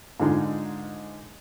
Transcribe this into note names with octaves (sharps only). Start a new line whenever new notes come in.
G#2 D3 G#3 D#4 F4